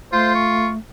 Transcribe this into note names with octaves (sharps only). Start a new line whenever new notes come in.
A3 F4 C5
C#6